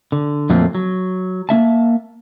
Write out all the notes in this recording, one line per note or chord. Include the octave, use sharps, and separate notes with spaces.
D3
F2 A#2 D3 F#3 A3 A#3
F#3
A#3 C4 E5 A5